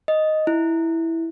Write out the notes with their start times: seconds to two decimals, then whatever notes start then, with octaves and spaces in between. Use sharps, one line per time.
0.08 D#5
0.47 E4